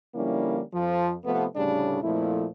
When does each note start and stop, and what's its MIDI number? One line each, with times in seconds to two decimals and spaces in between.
0.15 0.61 50
0.15 0.61 53
0.15 0.61 55
0.15 0.61 58
0.15 0.61 61
0.15 0.61 64
0.74 1.14 41
0.74 1.14 53
1.24 1.45 48
1.24 1.45 53
1.24 1.45 57
1.24 1.45 59
1.56 2.03 38
1.56 2.03 45
1.56 2.03 49
1.56 2.03 55
1.56 2.03 62
1.56 2.03 68
2.03 2.47 41
2.03 2.47 46
2.03 2.47 53
2.03 2.47 57
2.03 2.47 64